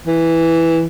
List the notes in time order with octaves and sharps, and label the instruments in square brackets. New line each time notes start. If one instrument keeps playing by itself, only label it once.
[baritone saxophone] E3